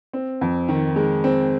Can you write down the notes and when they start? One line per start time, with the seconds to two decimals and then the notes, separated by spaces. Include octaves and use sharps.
0.13 C4
0.41 F2
0.69 D#3
0.96 G#3
1.24 C4